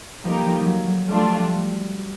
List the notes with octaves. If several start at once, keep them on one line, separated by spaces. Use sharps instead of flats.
F3 G3 A#3 D#4 G4 A#4
F3
F3
F#3
F#3
F3 G3 A3 D4 F4